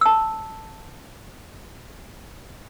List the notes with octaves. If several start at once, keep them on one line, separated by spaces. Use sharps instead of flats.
A5 E6